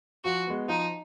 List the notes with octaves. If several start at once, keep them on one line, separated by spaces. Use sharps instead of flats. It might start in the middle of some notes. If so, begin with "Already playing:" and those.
F3 F#4
G#3 B3
F3 D#4